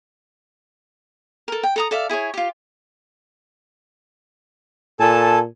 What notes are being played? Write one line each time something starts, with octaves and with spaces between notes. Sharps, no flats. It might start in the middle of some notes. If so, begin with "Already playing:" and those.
A4 A#4
G5
A4 A#5 D#6
A4 D5 E5 F5
E4 G#4 B4 C#5
F4 G4
A#2 A4 G#5 A5